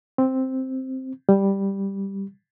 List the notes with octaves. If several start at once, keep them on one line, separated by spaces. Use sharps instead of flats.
C4
G3